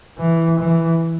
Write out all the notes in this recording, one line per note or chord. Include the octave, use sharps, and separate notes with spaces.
E3
E3